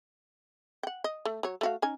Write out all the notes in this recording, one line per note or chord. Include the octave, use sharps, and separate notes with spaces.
F#5 G5
D#5
A3
F#3 C#5
A3 F#4 F5
C#4 D#4 G#5